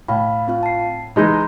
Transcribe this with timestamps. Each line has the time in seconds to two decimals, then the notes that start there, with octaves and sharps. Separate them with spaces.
0.08 A2 F5 B5
0.48 C4 F4 F5
0.63 A5 C7
1.16 E3 G#3 D#4 A#5 C6 G6